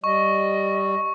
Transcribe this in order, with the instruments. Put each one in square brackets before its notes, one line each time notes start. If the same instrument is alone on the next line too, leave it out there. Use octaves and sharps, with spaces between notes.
[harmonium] G3 [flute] D#5 [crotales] C#6